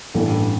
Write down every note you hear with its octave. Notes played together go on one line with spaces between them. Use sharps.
A1 G2 E3 G3 A4